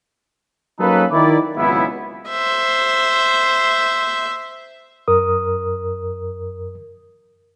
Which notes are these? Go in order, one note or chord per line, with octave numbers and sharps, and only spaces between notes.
F#3 A#3 C#4 D#4 A4 B4
D#3 E4 D5
G#1 C#2 F#3 B3 E4
C5 E5
F#2 A#4 D#6